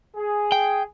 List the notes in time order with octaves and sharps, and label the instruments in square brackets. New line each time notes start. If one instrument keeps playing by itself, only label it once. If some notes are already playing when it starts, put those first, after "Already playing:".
[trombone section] G#4
[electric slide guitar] G5